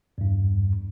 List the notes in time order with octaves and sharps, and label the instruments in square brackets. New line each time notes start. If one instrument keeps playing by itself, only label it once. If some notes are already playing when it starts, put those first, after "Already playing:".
[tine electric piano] E2 G2